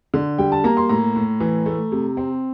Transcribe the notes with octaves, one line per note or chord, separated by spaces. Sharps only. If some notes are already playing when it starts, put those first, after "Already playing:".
D3
G3 G5
A5
A#3 A#5
C6
A2 A#5
A2
E3
A3
C3
C4